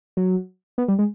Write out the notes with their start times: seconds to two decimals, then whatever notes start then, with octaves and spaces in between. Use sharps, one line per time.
0.17 F#3
0.78 B3
0.88 G3
0.99 G#3